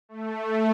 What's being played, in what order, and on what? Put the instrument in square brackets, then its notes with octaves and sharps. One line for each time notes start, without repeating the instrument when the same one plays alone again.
[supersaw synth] A3